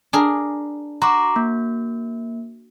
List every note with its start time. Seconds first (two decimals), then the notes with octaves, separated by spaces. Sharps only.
0.13 D4 G#4 A#4
1.02 F#4 A#5 C6 D6
1.36 A#3